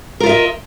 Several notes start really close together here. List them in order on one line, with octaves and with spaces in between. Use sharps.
A#4 F4 E5 D#5